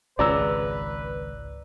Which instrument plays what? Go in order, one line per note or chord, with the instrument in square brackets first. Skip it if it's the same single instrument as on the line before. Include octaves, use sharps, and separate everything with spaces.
[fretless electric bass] G#1 C#2 C#3 [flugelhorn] B4 [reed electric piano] D5 A#5 E6